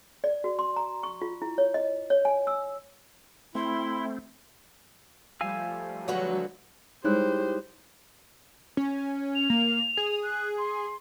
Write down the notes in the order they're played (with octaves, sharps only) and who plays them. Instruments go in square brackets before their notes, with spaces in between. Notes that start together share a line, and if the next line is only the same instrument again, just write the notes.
[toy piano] D5
F#4
C6
A#5
C#6
F4
E4
C#5
D#5
C#5
G#5
E6
[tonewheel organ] A3 C4 [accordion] E4 [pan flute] C6
[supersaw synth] F3 G3 A3 [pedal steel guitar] F5 G#5 E6
[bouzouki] D3 F#4 B4 [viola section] F#3
[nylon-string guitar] G3 G#3 E4 [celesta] D#4 C#5 F#6 [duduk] G4 [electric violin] C5
[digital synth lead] C#4
[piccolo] F7
[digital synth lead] A#3
G#4
[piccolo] F#6
C6